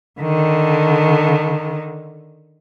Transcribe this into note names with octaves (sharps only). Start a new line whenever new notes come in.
D3 D#3